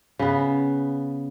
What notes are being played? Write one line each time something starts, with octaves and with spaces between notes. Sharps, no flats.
C#3 B3